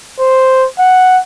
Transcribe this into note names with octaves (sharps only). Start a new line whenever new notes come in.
C5
F#5